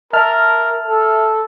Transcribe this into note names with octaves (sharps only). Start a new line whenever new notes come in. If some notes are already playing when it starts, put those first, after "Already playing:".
A#4 E5 A5 F6
A4